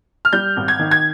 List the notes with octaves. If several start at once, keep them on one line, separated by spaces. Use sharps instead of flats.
F6
G3 G6
G#1
G#6
D#3
G#6